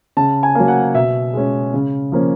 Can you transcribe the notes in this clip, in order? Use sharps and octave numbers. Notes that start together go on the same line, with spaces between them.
C#3 A5
G#5
F#3 A#3
F#5
B2 E5
G#3 C#4
C#3
F3 A#3 C#4